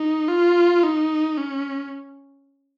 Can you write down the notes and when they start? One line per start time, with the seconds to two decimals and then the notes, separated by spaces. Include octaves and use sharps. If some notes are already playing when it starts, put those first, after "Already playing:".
Already playing: D#4
0.28 F4
0.83 D#4
1.37 C#4